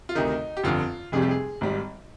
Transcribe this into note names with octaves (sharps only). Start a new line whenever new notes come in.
F4
D2 C3 D#3 D#4
G4
G1 F2 D3 F4
F1 F2 C3 G3 G#4
G4
G#4
G#1 G#2 G3